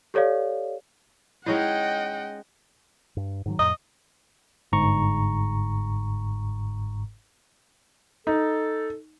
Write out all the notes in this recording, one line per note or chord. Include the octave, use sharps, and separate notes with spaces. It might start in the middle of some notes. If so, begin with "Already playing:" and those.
G4 A4 C#5 D5 F5
G#3 C#4 D#4 E4 D#5 F#5 G5
G2
G#2 D#3 F#3
F2 A2 D#5
G1 G#2 A#5 C#6
D#4 A4